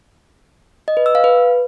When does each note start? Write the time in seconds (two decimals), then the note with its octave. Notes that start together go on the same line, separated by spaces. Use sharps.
0.88 D#5
0.97 B4
1.06 E6
1.15 F5
1.24 B4